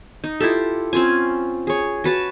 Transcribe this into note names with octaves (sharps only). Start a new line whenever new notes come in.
D#4
E4 F4 G4 A4
C4 C#4 F4 G#5
G#4 C#5
F#4 B4 A5